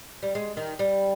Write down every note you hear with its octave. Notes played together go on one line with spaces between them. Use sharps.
G3
G#3
D#3
G3